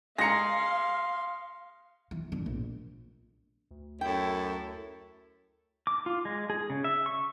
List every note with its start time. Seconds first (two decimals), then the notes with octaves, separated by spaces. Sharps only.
0.18 G#3 G#4 F5 A#5 C6 A#6 C#7
2.11 E3
2.32 D3
2.46 A#1
3.71 D2
4.01 F#2 E4 A4 G5
5.87 D6
6.06 F4
6.25 G#3
6.50 G#4
6.70 C#3
6.84 E5
7.06 C#6